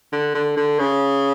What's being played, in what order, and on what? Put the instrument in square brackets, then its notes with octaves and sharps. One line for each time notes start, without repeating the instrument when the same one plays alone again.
[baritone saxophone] D3
D3
D3
C#3